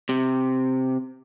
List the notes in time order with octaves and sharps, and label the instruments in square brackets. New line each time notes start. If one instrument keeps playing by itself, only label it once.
[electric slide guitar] C3